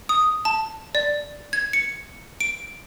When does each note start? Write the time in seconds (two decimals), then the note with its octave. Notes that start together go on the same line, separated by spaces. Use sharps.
0.09 D#6
0.45 A5
0.95 D5
1.53 G#6
1.73 C#7
2.40 D7